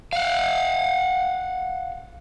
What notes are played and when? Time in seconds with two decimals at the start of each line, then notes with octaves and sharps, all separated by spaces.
0.13 F5 F#5